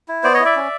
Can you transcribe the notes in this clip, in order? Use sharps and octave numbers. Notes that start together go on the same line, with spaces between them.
E4
B3 C5 D5
C#5 D#5
E4
D5 E5
C#4